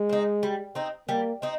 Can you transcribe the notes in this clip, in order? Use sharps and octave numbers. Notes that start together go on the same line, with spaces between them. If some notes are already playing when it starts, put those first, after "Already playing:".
Already playing: G#3
C4 D#4
G3
C4 D#4
G3 A#3
C4 D#4